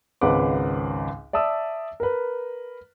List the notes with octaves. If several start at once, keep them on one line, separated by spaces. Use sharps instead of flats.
G#1 C#2 C#3 B4 F#5 D6
D5 E5 A5 D#6 E6
A#4 B4